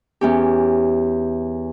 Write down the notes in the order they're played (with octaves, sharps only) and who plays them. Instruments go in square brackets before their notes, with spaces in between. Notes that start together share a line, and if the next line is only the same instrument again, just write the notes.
[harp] E2 C#4 G4